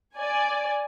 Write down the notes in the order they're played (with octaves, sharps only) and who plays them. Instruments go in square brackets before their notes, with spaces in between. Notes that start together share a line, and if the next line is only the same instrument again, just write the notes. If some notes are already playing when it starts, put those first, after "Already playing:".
[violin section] D5 G#5